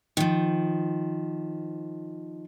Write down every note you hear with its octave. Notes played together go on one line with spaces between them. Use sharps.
D#3 F3